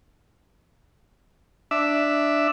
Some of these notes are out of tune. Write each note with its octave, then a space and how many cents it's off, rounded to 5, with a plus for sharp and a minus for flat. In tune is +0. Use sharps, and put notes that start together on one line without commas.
D4 +0 E5 +0